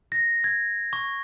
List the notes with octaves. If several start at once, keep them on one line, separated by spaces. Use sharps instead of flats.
A#6
G#6
C#6